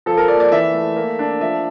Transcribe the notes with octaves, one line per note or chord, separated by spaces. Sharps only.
F3 A4
A#4
A#3 D5
D5
E3 E5
A3
A#3
D4
F3 E5